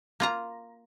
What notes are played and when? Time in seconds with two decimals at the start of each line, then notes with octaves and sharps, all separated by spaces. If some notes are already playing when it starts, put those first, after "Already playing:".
0.20 A#3 F4 A#5